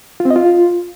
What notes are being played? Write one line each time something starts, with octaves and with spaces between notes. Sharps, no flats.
F4
C4
D#5
F4